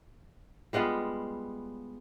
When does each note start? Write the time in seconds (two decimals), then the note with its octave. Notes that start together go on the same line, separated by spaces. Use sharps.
0.73 G3 G#3 B3 F4